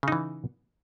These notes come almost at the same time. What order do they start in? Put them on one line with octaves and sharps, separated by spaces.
C#3 D#4 E3